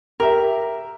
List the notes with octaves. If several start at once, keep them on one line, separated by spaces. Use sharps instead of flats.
G4 A#4 E5